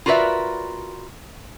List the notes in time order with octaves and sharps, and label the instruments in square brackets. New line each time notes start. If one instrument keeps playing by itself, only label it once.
[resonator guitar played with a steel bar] F4 F#4 A#4 B4 D5 E5